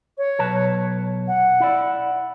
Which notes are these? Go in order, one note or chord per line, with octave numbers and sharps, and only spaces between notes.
C#5
B1 B4 A5
F#5
E4 D5